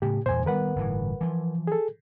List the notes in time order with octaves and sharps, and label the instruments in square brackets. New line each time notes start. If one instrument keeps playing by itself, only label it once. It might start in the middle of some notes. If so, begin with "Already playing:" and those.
[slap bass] A2 C#3 [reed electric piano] G4
[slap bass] E2 G2 A#2 [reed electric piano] C5 G#5
[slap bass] D#3 G3 B3 [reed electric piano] A#4 B4 F#5
[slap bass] G1 A2 E3
E3 F3
[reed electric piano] G#4 A4